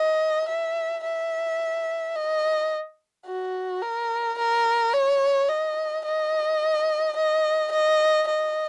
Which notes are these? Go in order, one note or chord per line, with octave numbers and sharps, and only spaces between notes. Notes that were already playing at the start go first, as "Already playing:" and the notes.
Already playing: D#5
E5
E5
D#5
F#4
A#4
A#4
C#5
D#5
D#5
D#5
D#5
D#5